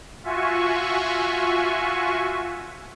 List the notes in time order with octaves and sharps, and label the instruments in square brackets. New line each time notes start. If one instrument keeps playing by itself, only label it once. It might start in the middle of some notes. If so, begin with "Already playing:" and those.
[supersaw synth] F4 F#4 E5 G#5 C#6